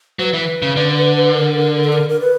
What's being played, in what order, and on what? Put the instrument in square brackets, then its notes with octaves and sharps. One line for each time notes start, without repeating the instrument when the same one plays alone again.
[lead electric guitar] F#3 [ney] B4 C5
[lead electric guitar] E3
C#3
D3
[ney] A#4
A4
A#4
A#4
B4